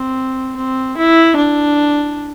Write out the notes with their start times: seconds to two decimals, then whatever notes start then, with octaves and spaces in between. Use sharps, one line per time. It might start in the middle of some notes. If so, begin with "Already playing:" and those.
Already playing: C4
0.56 C4
0.97 E4
1.36 D4